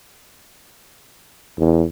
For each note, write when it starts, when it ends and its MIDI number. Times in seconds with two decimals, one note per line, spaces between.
1.58 1.85 40